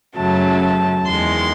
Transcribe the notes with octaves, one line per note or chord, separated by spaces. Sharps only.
F#2 C#3 F#3 A3 A5
E2 D#3 G#3 C6